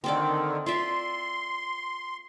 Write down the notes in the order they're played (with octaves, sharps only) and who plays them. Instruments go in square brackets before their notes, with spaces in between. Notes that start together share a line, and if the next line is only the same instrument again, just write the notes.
[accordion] D3 D#3 [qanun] C4 A4 D5
[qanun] F4 D5 E5 [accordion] C6